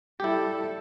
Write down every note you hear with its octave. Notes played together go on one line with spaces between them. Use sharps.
G3 E4 G4 A4